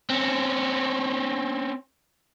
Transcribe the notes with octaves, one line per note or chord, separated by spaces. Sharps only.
C4 C#4